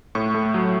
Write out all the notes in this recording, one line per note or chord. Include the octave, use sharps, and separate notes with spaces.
A2 C#6
A3
F#3